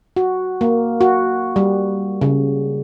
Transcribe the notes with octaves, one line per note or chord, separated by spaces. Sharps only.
F#4
A#3
F#4
G3
C#3